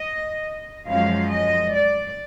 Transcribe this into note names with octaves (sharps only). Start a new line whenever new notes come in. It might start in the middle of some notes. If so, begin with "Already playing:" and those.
Already playing: D#5
F#2 F3 G#3 F5
D#5
D5